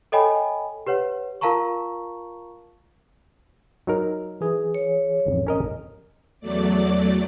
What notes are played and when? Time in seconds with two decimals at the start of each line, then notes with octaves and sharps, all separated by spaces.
0.12 A4 C#5 D#5 G5 G#5 B5
0.86 G4 B4 C#5 F#5
1.41 F4 A#4 F5 A5 A#5 C#6
3.87 F#3 D#4 A#4
4.41 E3 G#4
4.74 C#5
5.25 A1 F2
5.47 C#4 A#4 D#5
6.40 E2 F#3 A3 D5 D6